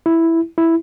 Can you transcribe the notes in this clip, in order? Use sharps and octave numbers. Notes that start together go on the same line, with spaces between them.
E4
E4